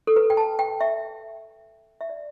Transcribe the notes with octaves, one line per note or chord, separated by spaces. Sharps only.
A4
B4
G5
A5
G5
E5
E5
D5